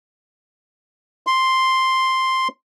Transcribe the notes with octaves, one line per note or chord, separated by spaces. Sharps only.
C6